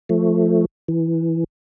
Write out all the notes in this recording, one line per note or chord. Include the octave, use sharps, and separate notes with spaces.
F3 A3
E3